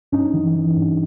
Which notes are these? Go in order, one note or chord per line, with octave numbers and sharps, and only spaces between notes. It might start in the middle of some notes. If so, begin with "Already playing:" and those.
G2 C#4 D#4
E3
E3
G2